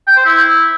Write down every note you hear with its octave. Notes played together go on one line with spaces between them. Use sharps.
G5
C5
E4